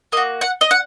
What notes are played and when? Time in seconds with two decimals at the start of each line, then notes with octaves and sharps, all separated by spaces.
0.12 A#3 D#5
0.17 F#4
0.41 F#5
0.61 D#5
0.71 F#5